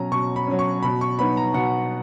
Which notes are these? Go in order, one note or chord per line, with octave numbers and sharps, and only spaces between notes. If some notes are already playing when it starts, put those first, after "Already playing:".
Already playing: B2 F#3 C#4 A#5
B2 C#6
B5
F#3 C#4
C#6
B2 B5
C#6
F#3 B3 D#4 B5
A#5
B2 F#5